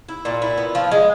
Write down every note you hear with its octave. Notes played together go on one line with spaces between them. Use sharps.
E4
A#2
E4
B3
F3
G#3